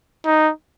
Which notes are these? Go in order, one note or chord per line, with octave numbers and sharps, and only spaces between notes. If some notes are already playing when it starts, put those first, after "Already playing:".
D#4